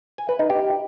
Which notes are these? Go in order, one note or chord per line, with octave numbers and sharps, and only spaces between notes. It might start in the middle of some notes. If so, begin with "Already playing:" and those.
G#5
B4
D#4
G4